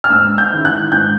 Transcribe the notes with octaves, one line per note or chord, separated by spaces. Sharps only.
F6
G#2 E6
G6
D#3 G#3 C#4 E4
F#6
G#2 G6